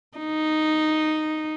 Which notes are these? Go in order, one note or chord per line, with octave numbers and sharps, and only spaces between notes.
D#4